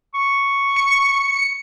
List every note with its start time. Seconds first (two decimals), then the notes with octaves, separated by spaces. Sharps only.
0.14 C#6
0.76 C#7